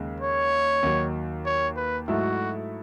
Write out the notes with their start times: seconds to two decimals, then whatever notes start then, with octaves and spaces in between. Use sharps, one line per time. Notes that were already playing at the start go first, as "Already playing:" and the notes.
Already playing: D#2 C#3 G#3
0.20 C#5
0.83 D#2 D#3 F#3
1.46 C#5
1.77 B4
2.08 G#2 F#3 A3 E4 F#4 A4